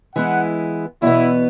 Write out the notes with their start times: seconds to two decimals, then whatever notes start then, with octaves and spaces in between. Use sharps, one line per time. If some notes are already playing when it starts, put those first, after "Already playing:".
0.15 E3 G#3 B3 E4 F#5
1.02 E2 B2 B3 E4